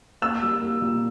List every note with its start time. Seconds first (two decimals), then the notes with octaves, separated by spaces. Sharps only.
0.22 A#3 E6
0.42 G3
0.62 A#3
0.82 A#2